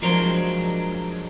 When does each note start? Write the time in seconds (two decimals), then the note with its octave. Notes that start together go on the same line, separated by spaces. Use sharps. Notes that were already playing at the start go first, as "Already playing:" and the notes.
0.02 F3 F#3 G#3 D4 A#4 C5